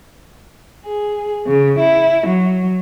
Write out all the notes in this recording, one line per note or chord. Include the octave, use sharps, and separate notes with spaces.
G#4
C#3
E4
F#3